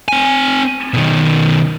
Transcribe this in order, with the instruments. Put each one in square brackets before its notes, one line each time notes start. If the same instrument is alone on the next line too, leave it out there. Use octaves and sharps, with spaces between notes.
[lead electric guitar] C4 G#5
B2 D#3